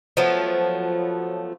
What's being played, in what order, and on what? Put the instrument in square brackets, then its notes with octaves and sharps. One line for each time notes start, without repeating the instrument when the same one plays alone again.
[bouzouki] F3 F#3 A3 B3